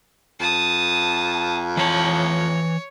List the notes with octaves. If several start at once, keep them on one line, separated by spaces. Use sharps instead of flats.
F2 A5 D#6
E3 C#5 A5